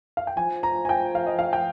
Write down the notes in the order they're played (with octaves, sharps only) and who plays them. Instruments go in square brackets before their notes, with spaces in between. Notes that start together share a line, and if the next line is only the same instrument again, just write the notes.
[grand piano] F5
G5
[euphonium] F3 [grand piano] G#5
[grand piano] A#5
G#5
G5
F5
D#5
F5
G5